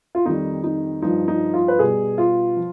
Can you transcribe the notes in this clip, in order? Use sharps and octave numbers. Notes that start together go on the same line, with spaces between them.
F4
F2 D#3 G3 D#4
D#4
G2 F3 D#4
D#4
F4
B4
B2 G3 G#4
F4
F3